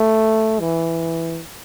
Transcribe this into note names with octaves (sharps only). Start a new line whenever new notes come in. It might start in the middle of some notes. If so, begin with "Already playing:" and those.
Already playing: A3
E3